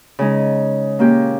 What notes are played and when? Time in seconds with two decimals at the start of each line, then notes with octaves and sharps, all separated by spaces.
0.19 C#3 G#3 D#4
0.99 A#2 A#3 C#4 G4